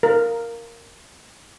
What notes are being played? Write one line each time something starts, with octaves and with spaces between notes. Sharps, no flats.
A#4